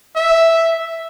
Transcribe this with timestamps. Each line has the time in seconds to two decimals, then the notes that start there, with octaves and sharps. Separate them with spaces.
0.16 E5